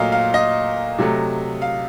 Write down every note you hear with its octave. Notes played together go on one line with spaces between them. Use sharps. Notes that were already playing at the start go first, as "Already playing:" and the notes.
Already playing: A#2 F#3 A3 D#5 F5
F5
D#5
C3 F#3 A3
F5